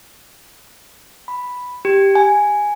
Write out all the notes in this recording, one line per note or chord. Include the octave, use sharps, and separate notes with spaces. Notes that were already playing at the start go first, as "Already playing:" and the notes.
B5
G4
G#5